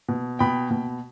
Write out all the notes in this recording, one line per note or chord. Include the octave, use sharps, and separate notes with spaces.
B2
B2 G5 B5
B2